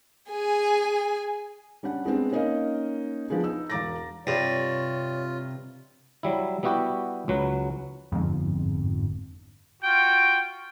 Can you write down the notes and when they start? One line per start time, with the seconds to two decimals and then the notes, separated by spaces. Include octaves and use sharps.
0.31 G#4 G#5
1.83 G3 C#4 D4 F#5
2.05 G#3 B3 C4 D4
2.32 A#3 C#4 D#4 A#4 D#5 F5
3.30 F3 B3 D4 G#4
3.44 D#4 E6
3.70 E1 F5 A#5 D6 A6 A#6
4.27 G2 C3 F4 C#5
6.23 F#3 G3 E4
6.63 G3 B3 E4 F#4 G4
7.28 C#2 F#3 B4
8.12 G1 F2 G#2
9.81 F4 F#4 G5